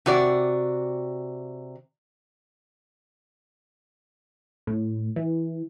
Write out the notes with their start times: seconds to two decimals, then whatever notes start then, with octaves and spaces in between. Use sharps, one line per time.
0.06 C3 F#4 D5
4.67 A2
5.16 E3